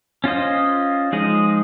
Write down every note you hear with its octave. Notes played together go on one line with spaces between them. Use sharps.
C#4 F4 C5 D#5
F3 G#3 D#4 G#4 D#5